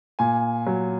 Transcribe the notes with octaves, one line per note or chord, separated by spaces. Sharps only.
A#2 G#5
F#3